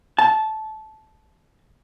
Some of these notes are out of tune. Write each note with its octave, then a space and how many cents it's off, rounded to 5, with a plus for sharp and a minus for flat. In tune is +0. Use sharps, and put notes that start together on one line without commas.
A5 -15